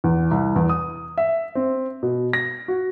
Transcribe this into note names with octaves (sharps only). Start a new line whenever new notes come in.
E2
C2
E2
D#6
E5
C4
B2
A#6
F#4